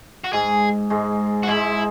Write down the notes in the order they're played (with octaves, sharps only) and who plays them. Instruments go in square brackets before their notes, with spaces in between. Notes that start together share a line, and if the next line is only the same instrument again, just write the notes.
[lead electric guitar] F#4
[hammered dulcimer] G#2 G#3 [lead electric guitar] G#4
[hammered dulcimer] G#2 G#3
[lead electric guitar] F#4
[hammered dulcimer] G#2 G#3 [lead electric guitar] E4